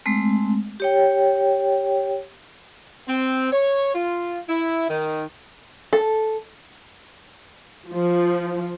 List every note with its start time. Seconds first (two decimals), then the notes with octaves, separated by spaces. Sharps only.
0.06 G#3 A3 C4
0.80 G4 C#5 G5
3.08 C4
3.52 C#5
3.95 F4
4.49 E4
4.90 D#3
5.93 A4
7.91 F3